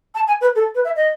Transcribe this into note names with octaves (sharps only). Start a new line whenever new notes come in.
A5
G#5
B4
A4
B4
E5
D#5